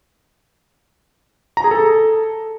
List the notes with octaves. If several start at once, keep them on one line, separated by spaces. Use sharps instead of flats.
A#5
G#4
A4